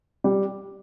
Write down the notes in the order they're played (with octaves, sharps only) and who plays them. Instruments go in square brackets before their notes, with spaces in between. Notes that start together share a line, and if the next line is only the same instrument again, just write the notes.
[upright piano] G3